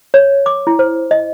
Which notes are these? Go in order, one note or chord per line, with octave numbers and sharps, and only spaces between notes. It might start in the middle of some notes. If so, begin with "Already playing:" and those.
C#5
D6
E4
C5
D#5